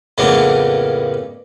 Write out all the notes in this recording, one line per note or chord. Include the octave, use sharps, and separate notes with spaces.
F2 A2 C#3 A#3 B3 D4